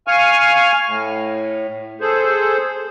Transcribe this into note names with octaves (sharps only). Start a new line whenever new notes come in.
F5 G#5 C#6 F6
A2
G#4 A4 C5